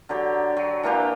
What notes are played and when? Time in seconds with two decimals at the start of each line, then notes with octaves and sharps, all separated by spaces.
0.09 D3 F#3 G4
0.57 F#3
0.83 E3 A#3 D4 G4